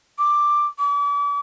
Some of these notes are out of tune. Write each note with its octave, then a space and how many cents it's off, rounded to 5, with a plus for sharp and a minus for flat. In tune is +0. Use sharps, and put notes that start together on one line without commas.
D6 +5
D6 -40